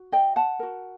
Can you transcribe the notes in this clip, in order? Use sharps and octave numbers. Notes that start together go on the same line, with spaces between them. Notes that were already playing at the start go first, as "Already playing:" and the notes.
Already playing: F#4
D#5 G5
F#5 A5
F#4 A#4